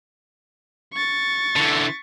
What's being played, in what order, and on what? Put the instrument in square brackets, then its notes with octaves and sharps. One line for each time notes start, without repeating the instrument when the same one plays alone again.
[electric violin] C#6 A6
[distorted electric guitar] D3 E3